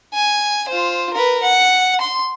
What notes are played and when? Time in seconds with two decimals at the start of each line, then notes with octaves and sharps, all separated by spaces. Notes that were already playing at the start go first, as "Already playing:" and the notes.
0.14 G#5
0.69 F4 C5
1.13 A#4 B4
1.43 F#5
2.01 C6